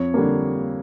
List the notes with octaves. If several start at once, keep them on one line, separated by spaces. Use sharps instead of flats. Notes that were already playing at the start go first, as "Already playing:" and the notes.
Already playing: F2 C#5
D3 G3 A#3